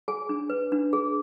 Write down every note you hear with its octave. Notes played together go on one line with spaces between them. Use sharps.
G#4 G#5
D4
B4
D4
G#4